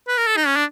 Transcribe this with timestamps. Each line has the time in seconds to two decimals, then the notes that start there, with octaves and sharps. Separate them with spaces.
0.08 B4
0.18 A#4
0.27 A4
0.37 D#4
0.47 C#4
0.56 D4